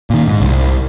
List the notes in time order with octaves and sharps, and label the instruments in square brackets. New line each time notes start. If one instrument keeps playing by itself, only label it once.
[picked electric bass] A#2 D#3
G#2
C2